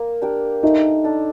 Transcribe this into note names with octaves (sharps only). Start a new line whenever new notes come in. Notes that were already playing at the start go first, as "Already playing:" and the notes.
Already playing: A#3
D4 G4 A#4
A3 D#4
D4 A4